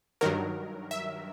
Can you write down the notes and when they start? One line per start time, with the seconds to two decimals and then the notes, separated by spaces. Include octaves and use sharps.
0.21 G2 D#3 F#3 A#4
0.91 E5